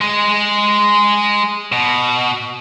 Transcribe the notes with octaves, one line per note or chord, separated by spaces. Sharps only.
G#3
B2